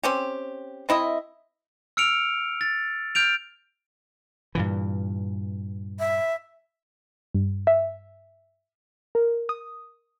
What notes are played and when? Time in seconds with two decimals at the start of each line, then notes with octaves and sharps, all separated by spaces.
0.04 C4 C#4 G4
0.89 C4 E4 D#5 E5
1.97 E6 F6 C#7 D7 F7
2.61 A6
3.15 F6 G6 D7 F7
4.55 G2 A#2 E3
5.99 E5
7.34 G2
7.67 E5
9.15 A#4
9.49 D#6